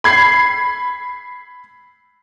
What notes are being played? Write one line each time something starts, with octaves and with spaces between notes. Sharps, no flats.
B5 G#6 C7